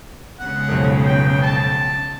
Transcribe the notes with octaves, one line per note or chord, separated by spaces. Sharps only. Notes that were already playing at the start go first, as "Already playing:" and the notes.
C#3 G#3 B3 F#5
F1 B1
G5
A5